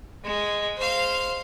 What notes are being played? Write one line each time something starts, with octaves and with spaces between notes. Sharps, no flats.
G#3
C5 F5